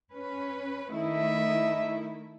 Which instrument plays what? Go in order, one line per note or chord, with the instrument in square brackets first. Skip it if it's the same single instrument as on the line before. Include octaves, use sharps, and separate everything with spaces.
[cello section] C#4 B4
[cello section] D#3 A3 E4 [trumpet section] D#5 E5